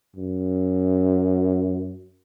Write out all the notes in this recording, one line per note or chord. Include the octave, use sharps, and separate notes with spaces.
F#2